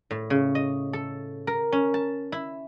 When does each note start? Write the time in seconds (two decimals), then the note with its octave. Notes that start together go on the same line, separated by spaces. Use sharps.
0.11 A2
0.30 C#3
0.55 D#5
0.93 A4
1.47 A#4
1.72 C#4
1.94 A5
2.32 E4